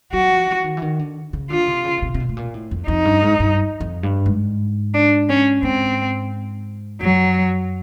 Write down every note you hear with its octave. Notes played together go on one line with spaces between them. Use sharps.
F#3 F#4
F3
E3
D#3
E3
D#3
D3
C#3
D3 F4
C3
C#3
B2
C3
C3
B2
A2
A#2
A2
F2
F2 D#4
G2
G#2
G2
F2
G2
G#2
D4
C#4
G#2 C4
F#2 F#3